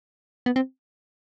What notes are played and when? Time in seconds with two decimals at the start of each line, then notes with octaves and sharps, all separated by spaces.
0.46 B3
0.56 C4